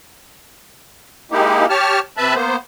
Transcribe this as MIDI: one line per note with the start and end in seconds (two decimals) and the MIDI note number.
1.32 1.66 56
1.32 1.66 58
1.32 1.66 63
1.32 1.66 64
1.32 1.66 67
1.69 2.00 67
1.69 2.00 73
1.69 2.00 81
1.69 2.00 89
2.17 2.34 48
2.17 2.34 71
2.17 2.34 76
2.17 2.34 81
2.17 2.34 83
2.34 2.56 58
2.34 2.56 59
2.34 2.56 72